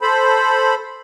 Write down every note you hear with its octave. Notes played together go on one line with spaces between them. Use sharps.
A4 C5 B5